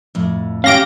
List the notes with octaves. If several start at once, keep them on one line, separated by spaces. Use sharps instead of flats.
F2 A2
C#4 G4 F5 A#6 D7